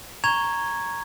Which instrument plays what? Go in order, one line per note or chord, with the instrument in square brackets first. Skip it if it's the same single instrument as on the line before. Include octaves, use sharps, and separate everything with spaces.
[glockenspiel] A#5 C#6 G#6 F7 G7